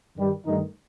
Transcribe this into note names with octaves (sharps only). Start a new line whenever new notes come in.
G2 D#3 G3
G2 D#3 A3 D#4